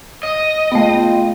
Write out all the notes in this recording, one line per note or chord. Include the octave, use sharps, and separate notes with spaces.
D#5
C#2 A3 B3 F4 G5